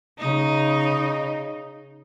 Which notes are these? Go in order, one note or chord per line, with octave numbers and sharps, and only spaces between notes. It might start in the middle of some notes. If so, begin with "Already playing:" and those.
C#3 D#4